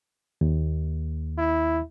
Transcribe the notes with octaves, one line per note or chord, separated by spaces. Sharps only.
D#2
E4